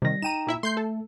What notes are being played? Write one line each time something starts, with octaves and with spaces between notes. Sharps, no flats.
C3 D#3 G3 A#6
D#4 G5 A#5 D#7 E7
A#2 E4 E5
A3 C6 G6 C7
A4